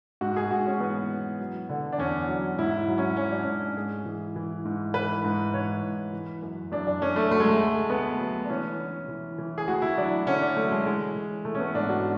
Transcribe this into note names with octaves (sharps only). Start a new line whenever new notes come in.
G#2 F#4
G#4
G#2 F#4
C#4
E3 B3
E3
F#3
D3
D4
E2 C#4
F#3
G#2 E4
F#3
C#4
F#3 C#4
D4
G#2 C#4
G#2 G#4
E3
E3
G#2
E3 B4
G#2
E3 C#5
G#2
E3
F#2
F#2 D4
D4
F#2 C#4
A3
F#3 A3
G#3
A3
D2
D2 B3
F#3
D4
E3 C#4
E3
E3
E3
G#4
D2 F#4
E4
F#3 D4
D3 C#4
D4
F#3 A3
G#3
E3 G#3
E3
E3 A3
C#4
B3
G#2 D4
F#4